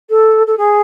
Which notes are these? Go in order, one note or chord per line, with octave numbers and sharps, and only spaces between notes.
A4
A4
G#4